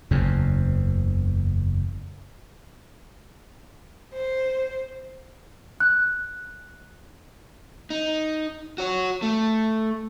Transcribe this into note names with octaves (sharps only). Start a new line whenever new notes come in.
F#1 E2 C#3
C5
F#6
D#4
F#4 C#5
A3